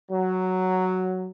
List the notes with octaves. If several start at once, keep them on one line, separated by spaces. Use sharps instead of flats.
F#3